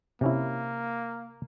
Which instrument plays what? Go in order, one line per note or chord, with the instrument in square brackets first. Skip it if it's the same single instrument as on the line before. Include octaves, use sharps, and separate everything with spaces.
[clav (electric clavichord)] C3 C#4 E4 [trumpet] A#3